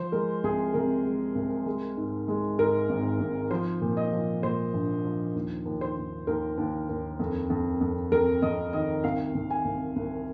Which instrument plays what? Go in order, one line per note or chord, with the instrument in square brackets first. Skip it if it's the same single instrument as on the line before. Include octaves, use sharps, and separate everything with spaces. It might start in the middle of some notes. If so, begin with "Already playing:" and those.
Already playing: [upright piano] F3 C5
G#3 A#4
C2 G#4
C3 A#4
G#3
C2
G#3
G#2
G#3
G#2 A#4
G#1
G#1
F3 C5
A#2
D#5
F3
A#2 C5
A#1
F3
D#2
D#2
C5
D#2
D#2 A#4
D#2
D#2
F2
F2
F2
F2 A#4
F2 D#5
D#3 D#5
C2 F5
C2
G#5
C2
C2